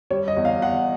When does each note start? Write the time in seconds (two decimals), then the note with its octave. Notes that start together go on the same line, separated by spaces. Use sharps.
0.10 G3 C#5
0.28 D#5
0.37 E2
0.45 F5
0.62 E2 F#5